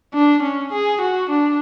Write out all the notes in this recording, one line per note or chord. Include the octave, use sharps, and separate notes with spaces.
D4
C#4
G#4
F#4
D4